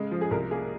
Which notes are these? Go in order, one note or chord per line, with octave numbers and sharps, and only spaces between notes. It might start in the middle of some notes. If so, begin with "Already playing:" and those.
Already playing: C#3 G#3
F3
G#4
C2 A#4
A#3 G#4